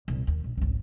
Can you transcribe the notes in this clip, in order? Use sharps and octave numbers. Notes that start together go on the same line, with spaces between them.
C2 A#2
D#2
A#1
G#1 C#2